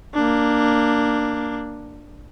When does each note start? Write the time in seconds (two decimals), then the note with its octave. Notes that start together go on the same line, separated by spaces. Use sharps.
0.14 A#3 D4